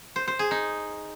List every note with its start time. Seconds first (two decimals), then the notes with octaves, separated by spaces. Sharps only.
0.16 C5
0.28 C5
0.39 G#4
0.51 D#4